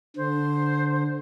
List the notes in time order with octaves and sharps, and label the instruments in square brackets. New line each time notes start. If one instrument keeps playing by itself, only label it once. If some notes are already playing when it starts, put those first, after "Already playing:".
[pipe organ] D3 [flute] C5